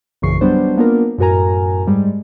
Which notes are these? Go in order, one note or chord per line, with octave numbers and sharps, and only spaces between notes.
A#1 F#2 C#3 E3 C#6 C7
F#3 G3 B3 D4 C5
A#3 B3 D4 F4 A#4
F#2 A2 F#4 A#4 G#5 A#5
G#2 G3 G#3